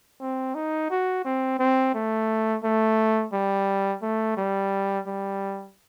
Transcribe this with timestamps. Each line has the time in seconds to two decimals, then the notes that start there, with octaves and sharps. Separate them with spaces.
0.21 C4
0.55 D#4
0.90 F#4
1.25 C4
1.59 C4
1.94 A3
2.64 A3
3.33 G3
4.02 A3
4.37 G3
5.07 G3